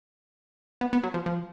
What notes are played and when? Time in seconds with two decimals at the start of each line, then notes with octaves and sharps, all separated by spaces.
0.81 B3
0.93 B3
1.03 F#3
1.14 F3
1.26 F3